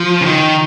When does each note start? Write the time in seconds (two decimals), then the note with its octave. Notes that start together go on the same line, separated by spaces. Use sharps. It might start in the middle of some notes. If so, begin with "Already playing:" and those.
Already playing: F3
0.21 C#3
0.26 D#3